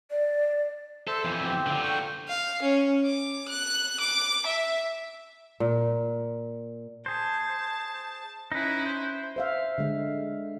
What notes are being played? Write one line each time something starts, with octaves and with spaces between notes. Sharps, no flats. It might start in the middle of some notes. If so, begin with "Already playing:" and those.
D5
A4 C5 E5
F2 E3
C4 G4
D3 F4
G5 C#6
F5
C#4
D6
F#6
D6
E5
A#2
G#4 C5 A5
C#4 D#4 E4 B4
C5
C5 E5 F5
D3 G#3